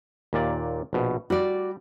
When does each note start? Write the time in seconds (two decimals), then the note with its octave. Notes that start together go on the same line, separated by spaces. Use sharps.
0.33 D#2 A#2 D5
0.93 A#1 B2
1.30 G3 F#4 D5